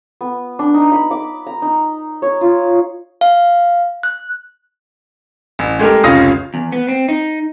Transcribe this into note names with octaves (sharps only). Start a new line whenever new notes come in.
B3
D4
D#4
B5
D6
A#5
D#4
C#5
F4
F5
F#6
A1
G#3 A3 G4 A#4
F1 C#2 C#4 F4 D#6 A#6
E2
B3
C4
D#4